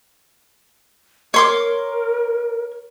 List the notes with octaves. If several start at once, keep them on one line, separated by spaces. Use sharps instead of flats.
A#4 C#5 C6 D6